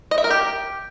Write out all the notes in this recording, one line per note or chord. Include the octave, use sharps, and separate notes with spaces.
D#5
E5
A#4
G4